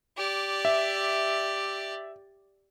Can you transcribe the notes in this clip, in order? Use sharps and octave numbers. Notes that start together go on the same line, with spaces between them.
G4 D5
E5